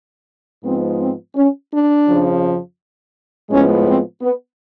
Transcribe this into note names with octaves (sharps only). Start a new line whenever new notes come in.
G#2 F3 G#3 B3 C4
C4
C#4
D4
F2 C#3 F3
A2 F3 G#3 B3 C#4
C4
B3